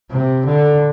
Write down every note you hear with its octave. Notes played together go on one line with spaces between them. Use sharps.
C3
D3